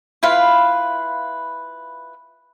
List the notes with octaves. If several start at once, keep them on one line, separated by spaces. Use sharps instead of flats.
E4 F4 B4 F5